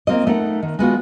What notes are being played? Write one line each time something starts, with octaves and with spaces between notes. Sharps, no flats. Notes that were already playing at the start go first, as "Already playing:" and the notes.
A#3 C4 F4 D#5
A3 D#4 A#4 F#5
D#3
G#3 B3 F4 F#4